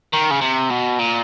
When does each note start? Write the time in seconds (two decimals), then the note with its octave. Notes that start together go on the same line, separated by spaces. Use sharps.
0.13 D#3
0.31 C#3
0.41 C3
0.70 B2
0.99 A#2